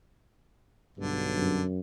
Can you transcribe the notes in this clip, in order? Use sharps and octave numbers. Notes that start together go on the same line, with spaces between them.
B1 G2 D3
F#2